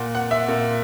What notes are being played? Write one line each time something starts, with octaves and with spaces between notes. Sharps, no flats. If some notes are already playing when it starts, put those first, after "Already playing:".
Already playing: A#2 F#5
F#5
E5
A#2